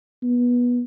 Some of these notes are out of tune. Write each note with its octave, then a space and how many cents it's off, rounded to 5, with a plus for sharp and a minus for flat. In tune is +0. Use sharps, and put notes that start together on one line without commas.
B3 -20